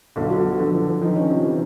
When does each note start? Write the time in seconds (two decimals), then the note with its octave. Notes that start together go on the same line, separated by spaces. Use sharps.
0.16 B1 D3
0.30 F#3
0.44 F#3
0.59 D3 F3
0.74 F3
0.88 F3
1.02 D#3 F3
1.16 C#4
1.30 C3
1.44 E3